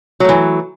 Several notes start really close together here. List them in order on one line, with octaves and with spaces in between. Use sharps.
F#3 A3 E3